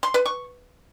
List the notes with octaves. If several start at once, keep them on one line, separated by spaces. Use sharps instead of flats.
C6
B4
C#6